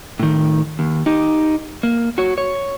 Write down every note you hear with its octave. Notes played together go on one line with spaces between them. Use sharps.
A2 D#3
D#2
D#4 G4
A#3
F#4 C#5
C#5